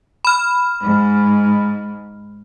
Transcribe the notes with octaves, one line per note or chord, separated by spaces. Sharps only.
B5 F6
G#2